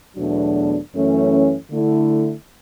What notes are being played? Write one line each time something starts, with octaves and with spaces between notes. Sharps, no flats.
E2 B2 F#3 A3 D4
F#2 E3 A3 C#4
D3 A3 E4